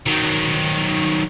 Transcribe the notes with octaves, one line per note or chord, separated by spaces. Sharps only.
D#3 F#3